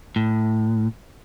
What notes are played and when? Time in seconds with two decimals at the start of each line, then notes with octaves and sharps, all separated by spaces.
0.16 A2